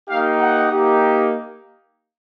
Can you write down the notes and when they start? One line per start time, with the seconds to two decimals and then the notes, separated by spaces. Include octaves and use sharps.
0.09 A#3 D#4 G4 F5
0.40 F#5
0.72 A#3 D#4 G4